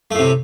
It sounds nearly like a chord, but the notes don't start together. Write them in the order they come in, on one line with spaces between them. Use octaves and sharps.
A3 A2 C3